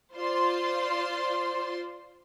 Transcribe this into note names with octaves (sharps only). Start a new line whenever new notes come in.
F4 C5 D5 C6